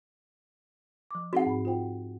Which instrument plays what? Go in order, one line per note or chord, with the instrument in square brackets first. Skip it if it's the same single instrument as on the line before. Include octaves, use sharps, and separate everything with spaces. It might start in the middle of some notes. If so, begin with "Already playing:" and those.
[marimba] F3 D6
[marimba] C4 D#4 G#4 [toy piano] F#4 F#5
[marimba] G#2 B5
F4 C5 G5